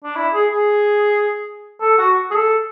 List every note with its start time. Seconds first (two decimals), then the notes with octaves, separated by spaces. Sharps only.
0.04 D4
0.16 E4
0.34 G#4
0.52 G#4
1.81 A4
1.99 F#4
2.31 G#4
2.35 A4